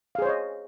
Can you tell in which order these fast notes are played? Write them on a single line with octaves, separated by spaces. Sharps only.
F5 G#4 C5 C#5 D#5